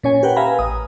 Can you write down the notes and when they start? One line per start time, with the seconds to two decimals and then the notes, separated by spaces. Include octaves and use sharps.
0.03 A#2 C#4 C#5 G#5
0.23 G4 A#4 B4 F#5 G5
0.36 B4 E5 F5 G#5 A#5 B5
0.59 A1 D#6